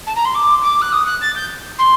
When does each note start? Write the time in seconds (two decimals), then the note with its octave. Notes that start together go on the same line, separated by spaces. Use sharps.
0.06 A5
0.15 A#5
0.25 C6
0.34 D6
0.63 D6
0.81 F#6
0.92 D#6
1.06 F#6
1.21 A6
1.35 G6
1.78 C6